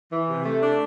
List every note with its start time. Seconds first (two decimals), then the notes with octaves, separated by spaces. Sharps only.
0.12 E3
0.29 C3
0.45 A3
0.62 D4